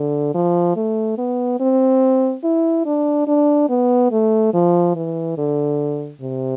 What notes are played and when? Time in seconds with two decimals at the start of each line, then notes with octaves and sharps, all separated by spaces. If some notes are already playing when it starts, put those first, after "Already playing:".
Already playing: D3
0.34 F3
0.76 A3
1.18 B3
1.60 C4
2.44 E4
2.86 D4
3.27 D4
3.69 B3
4.11 A3
4.53 F3
4.95 E3
5.38 D3
6.21 C3